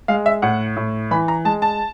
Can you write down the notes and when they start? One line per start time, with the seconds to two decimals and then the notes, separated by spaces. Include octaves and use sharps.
0.08 G#3 F5
0.26 E5
0.42 A2 F#5
0.77 A2
1.11 E3 B5
1.28 A#5
1.45 G#3 A5
1.62 A5